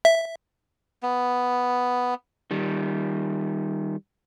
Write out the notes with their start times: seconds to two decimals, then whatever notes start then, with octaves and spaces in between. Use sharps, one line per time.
0.05 E5
1.03 B3
2.51 D#3 G3